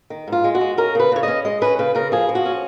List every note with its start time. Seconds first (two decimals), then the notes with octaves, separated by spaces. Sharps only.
0.10 D#3
0.28 G#2 F4
0.44 G#3
0.55 F#4
0.61 G#3
0.78 C#4 A#4
0.95 C#3 B4
1.12 C#3 C#5
1.23 C#4 D#5
1.45 G#3 D#5
1.62 C#4 B4
1.79 C#3 B4
1.95 C#3 A#4
2.12 F3 G#4
2.29 F3
2.35 F#4
2.46 C#4